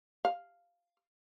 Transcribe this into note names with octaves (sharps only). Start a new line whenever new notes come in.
F5